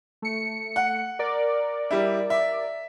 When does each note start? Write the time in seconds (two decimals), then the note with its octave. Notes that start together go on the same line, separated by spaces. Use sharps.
0.22 A3 C#7
0.76 F#5
1.19 A#4 D5
1.91 G3 E4
2.30 E5